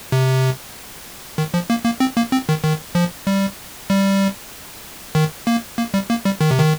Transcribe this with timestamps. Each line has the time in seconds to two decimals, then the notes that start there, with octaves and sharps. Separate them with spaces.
0.12 C3
1.38 D#3
1.54 F3
1.70 A#3
1.85 A#3
2.00 C4
2.17 A#3
2.32 C4
2.49 D#3
2.64 D#3
2.95 F3
3.27 G3
3.90 G3
5.15 D#3
5.47 A#3
5.78 A#3
5.94 G3
6.10 A#3
6.25 G3
6.41 D#3
6.51 C3
6.60 D#3